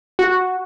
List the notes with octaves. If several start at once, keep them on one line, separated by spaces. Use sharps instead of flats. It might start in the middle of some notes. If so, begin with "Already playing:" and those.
F#4